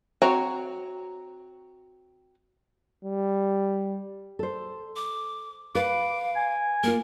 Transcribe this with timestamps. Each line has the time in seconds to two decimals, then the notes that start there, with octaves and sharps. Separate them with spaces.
0.22 C4 F#4 C#5 A#5
3.05 G3
4.39 A4 C5
4.96 D6
5.75 B4 F5 D6
6.36 G#5
6.83 A#3 F4 A#4